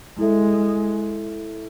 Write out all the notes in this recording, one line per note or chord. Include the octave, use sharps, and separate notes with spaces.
G#3 E4 A4 E5